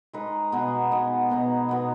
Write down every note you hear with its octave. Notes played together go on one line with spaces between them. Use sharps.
G#3 D#4 B4
B2 B3 D#4 G#4
B2 B3 D#4 G#4
B2 B3 D#4
B2 B3 D#4